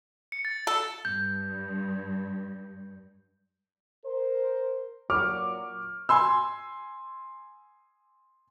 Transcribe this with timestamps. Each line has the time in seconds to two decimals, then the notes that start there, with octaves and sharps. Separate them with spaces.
0.32 C#7
0.45 A6
0.67 A4
1.05 G2 G6
4.05 A#4 C5
5.10 A#2 F#3 C#6 D6 F6
6.09 G#5 C6 E6